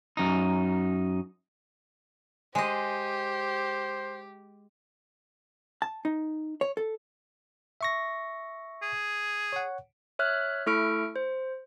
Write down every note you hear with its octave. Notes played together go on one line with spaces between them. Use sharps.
F#2 D#4
G#3 G4 C5 D#5
A5
D#4
C#5
A4
E5 C#6 A#6
G#4
C#5 F#5
C#5 E5 F6 F#6
A3 E4 A4 C#6 F6 D7
C5